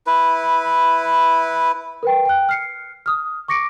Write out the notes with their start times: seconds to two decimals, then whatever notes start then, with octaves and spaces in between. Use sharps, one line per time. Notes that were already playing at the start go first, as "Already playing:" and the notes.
0.07 E4 B4
2.03 A#4 B4 G5
2.25 G5 F#6
2.49 F6 C7 C#7
3.06 D#6 F6
3.48 C#6 D6 A#6 C#7 D7